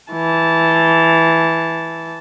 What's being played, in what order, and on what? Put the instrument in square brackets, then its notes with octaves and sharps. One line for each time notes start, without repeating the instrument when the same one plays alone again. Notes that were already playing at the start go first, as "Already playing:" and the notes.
[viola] E3 A5